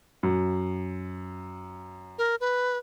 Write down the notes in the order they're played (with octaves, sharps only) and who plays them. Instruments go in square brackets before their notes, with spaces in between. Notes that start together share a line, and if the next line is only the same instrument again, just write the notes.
[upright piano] F#2
[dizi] A#4
B4